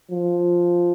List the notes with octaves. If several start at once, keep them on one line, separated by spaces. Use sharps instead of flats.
F3